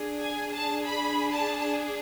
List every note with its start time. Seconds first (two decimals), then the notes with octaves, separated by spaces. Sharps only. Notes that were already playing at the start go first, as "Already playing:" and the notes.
Already playing: D4 G#4
0.22 G#5
0.53 A5
0.85 B5
1.32 A5